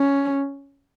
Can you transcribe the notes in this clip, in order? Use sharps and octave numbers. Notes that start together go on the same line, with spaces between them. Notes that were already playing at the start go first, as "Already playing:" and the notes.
Already playing: C#4